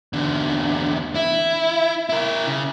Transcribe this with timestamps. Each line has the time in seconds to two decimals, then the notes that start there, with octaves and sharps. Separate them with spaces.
0.13 E2 D3
1.15 E4
2.09 E4 A#4
2.47 C#3